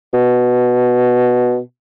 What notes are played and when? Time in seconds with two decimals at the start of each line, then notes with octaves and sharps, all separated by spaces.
0.14 B2